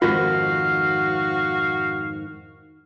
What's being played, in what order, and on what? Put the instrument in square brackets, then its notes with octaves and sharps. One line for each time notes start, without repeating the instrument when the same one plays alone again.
[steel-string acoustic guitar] F2 G#2 D#3 [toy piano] F4 [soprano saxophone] F#4 [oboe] F5